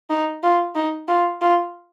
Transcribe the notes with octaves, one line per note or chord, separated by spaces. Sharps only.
D#4
F4
D#4
F4
F4